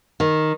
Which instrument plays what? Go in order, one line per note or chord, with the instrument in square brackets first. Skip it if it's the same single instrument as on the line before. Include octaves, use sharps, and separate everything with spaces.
[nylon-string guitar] D#3